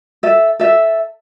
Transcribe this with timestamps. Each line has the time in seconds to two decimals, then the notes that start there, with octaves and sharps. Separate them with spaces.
0.23 A4 E5
0.59 A4 E5